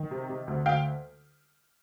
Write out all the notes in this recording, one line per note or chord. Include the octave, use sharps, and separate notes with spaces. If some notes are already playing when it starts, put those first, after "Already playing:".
Already playing: D#3
C3
C3
D2
D2 F5 G5